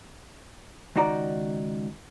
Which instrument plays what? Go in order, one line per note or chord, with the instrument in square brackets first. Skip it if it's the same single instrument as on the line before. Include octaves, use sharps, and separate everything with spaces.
[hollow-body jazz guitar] C#2 D#3 D#4 F#4 D5 A#5